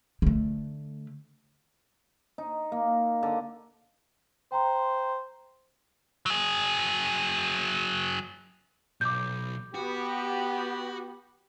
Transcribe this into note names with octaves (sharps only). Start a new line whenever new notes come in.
D3 A3
D#4
A#3
D3
C5 G5 A#5 C6
F#3 G#4
B1 D6 G6
B3 F#4 G4